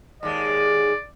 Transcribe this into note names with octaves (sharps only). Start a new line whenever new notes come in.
D#2 G#3 D5